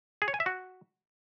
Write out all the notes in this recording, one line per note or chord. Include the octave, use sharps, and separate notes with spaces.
G#4
C#5
G#5
E5
F#4